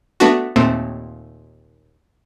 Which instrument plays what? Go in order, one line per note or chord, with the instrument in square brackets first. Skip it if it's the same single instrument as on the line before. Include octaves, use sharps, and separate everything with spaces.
[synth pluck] A3 B3 D4 F#4
D#2 A#2 A3 C4